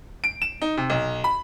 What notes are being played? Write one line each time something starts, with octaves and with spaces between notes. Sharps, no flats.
D7
E7
D#4
C3
B1
B5